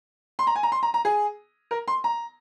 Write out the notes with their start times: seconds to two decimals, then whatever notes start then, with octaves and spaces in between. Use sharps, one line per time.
0.39 C6
0.47 A#5
0.55 G#5
0.63 A#5
0.72 C6
0.83 A#5
0.94 A#5
1.05 G#4
1.71 A#4
1.88 C6
2.04 A#5